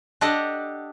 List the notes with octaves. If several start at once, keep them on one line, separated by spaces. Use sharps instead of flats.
D4 G4 A4 D#5 F#5